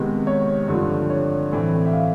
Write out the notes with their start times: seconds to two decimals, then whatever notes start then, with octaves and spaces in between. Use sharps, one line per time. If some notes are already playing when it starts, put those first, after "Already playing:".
Already playing: C3 D#3 G#3 B3
0.27 C#5
0.68 G2 D3 F3
1.10 C#5
1.52 A2 E3 A3 C4
1.86 E5
1.93 F5